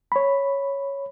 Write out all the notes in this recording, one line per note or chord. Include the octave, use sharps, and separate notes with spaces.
C#5 B5